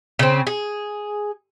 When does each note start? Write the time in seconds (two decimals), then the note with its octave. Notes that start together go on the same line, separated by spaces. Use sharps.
0.19 C#3 C4
0.47 G#4